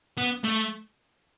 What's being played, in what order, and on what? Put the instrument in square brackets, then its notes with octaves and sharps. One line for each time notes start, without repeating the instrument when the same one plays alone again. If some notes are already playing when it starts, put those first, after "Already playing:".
[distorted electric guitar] B3
A3